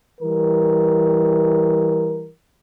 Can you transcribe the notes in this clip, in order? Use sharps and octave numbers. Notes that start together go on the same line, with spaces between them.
E3 G3 A#4